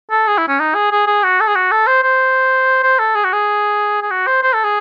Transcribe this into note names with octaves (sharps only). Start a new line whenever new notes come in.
A4
G#4
E4
C#4
D#4
G#4
G#4
G#4
F#4
A4
G#4
F#4
A4
C5
C5
C5
A4
G#4
F#4
G#4
G#4
F#4
C5
C5
A4
G#4